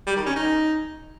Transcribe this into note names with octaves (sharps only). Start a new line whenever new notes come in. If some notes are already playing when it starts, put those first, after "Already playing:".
G3
D#3
C#4
D#4